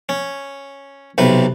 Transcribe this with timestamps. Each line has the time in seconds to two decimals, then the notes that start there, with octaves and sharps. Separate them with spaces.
0.09 C#4
1.18 B1 C3 B4